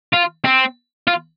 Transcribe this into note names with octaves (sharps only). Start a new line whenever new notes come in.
F4
C4
F4